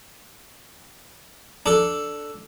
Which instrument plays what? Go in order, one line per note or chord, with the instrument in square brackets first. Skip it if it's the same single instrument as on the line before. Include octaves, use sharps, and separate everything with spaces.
[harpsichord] D4 A4